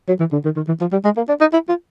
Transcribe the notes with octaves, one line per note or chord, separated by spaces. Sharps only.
F#3
E3
D3
D#3
D#3
E3
F3
G3
G#3
A#3
D4
D#4
E4
F4